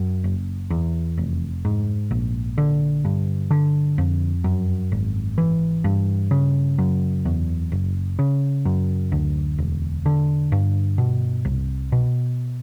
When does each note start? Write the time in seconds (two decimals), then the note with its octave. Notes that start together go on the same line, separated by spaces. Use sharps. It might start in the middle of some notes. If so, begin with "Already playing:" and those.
Already playing: F#2
0.24 F#1
0.70 E2
1.18 F1
1.65 G#2
2.11 A#1
2.58 D3
3.05 G2
3.51 D3
3.98 F2
4.44 F#2
4.92 G#1
5.38 E3
5.84 G2
6.31 C#3
6.78 F#2
7.25 E2
7.72 F#1
8.19 C#3
8.65 F#2
9.12 D2
9.58 E1
10.06 D3
10.52 G2
10.98 B2
11.45 C2
11.92 B2